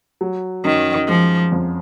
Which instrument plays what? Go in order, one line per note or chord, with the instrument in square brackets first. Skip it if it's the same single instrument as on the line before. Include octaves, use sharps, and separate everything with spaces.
[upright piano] F#3
[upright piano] F#2 [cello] D#3
[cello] F3 [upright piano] G#3
[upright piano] F2